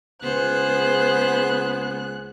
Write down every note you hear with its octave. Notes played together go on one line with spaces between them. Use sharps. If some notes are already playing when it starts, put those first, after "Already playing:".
C#2 B3 G#4 C5 F#6